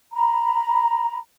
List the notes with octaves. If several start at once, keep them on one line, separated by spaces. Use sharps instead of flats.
A#5 B5